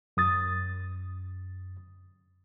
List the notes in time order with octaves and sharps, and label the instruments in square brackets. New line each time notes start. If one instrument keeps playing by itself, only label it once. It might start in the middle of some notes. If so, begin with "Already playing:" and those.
[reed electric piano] F#2 D#6 A6